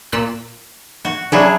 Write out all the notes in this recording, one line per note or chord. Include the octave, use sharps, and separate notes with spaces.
A#2 E6 F#6
F#4
C#3 F#3 D4 E4 G#4